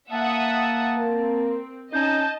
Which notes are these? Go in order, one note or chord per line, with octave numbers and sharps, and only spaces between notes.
A#3 E5 F#5 A5 D#6
C4 A#4
C#4 D#4 D#5 A5 G6